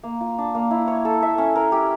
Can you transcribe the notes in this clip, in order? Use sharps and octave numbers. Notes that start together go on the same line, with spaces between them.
A#3
F4
D4
A#3
E4
C#5
A4
E5
C#4
A#4
G4